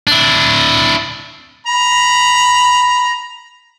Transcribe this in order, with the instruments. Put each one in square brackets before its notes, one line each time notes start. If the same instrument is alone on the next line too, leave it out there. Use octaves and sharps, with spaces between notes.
[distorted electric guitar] D4 E4
[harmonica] A#5 B5